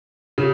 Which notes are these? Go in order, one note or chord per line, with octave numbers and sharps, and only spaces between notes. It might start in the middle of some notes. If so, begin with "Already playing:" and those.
C#3